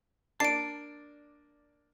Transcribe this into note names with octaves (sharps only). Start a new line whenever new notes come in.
A#3 D4 D5 A5 C7 D7